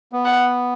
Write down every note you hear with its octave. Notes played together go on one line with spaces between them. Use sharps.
B3
F#5